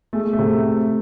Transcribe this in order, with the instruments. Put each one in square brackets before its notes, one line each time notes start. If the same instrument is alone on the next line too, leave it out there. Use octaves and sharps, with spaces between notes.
[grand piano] G#3 [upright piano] A3
[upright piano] A3
[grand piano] C3